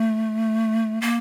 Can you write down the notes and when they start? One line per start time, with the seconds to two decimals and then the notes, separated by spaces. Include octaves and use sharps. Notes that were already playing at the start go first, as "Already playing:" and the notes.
Already playing: A3
1.01 A#3